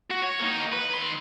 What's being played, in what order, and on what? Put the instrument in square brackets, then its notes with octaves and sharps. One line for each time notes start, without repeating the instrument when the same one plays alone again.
[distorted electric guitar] F#4
C#5
A#3 D#4
B4
D#3 C6